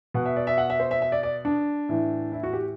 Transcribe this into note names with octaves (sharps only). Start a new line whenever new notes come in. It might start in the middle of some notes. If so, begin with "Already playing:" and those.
B2 F#5
E5
D5
E5
F#5
E5
C5
E5
E5
D5
D5
D4
A2 E3
E4
F#4
G4